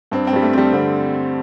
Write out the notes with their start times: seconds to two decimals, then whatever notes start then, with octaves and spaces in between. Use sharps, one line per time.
0.11 G2 C4
0.27 C4
0.33 G2 G3
0.42 A3
0.53 G3 C4
0.73 D3 C4